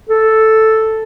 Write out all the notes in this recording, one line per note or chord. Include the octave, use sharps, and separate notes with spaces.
A4